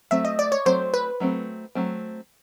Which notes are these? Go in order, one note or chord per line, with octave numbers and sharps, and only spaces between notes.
F#3 A3 C4 E5
D#5
D5
C#5
F#3 A3 C4 C5
B4
F#3 A3 C4
F#3 A3 C4